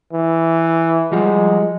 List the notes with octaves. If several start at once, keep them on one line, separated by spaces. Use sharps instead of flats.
E3
F3 G3 G#3 F#4